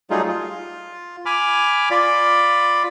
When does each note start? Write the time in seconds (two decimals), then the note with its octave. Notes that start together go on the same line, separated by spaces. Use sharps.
0.10 F#3 G3 A3 D#4 F4 G#4
0.28 F4
1.26 G#5 B5 D6 F6
1.91 F4 D5 B5